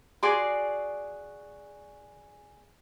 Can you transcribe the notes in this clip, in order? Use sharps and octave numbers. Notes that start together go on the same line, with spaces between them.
F#4 G#4 D5 C6